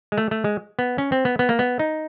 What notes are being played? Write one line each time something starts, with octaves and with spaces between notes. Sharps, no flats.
G#3
A3
A3
G#3
B3
C#4
C4
B3
B3
A#3
B3
D#4